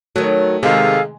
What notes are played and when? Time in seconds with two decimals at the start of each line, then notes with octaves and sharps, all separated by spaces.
0.16 D#3 F#3 A3
0.63 C3 D#3 G#3 G#4 A4 F5